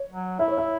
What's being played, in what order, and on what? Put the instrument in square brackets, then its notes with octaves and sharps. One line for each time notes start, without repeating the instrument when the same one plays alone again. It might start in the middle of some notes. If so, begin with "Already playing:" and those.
Already playing: [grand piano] C#5
[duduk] F#3
[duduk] E4 [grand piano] E5
[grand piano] C#5
E5